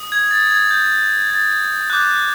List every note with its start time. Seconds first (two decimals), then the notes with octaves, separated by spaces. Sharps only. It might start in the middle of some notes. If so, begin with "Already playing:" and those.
Already playing: D#6
0.12 G#6
0.31 A6
0.51 G#6
0.71 G6
1.30 A6
1.90 D6 F#6 G6